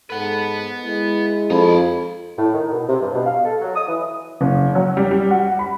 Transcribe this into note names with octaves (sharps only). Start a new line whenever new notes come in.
G#2 A4 B4 F#5
G#3 E4
F2 D#4 B5
A2
D#3
B2
C3
G2
B2
F5
A4
F#3
D#6
E3
F#1
F#3
G3
G3
F#4
B5